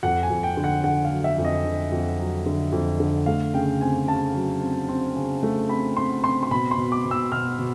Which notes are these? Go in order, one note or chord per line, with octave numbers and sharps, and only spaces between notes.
F2 F#5
G#5
F2
G5
D3
F#5
D3 F#5
F5
F#3
E5
F2
D#5
D3
F2
F#3
D3
F2
D3
A3 F5
C#3 G5
C4 G#5
C#3 A5
F#3
C4
C4
C#3
A3
C4 B5
C4 C6
C4 C6
C6
B2 B5
C6
B2
D6
B2
E6
B2 F6
B2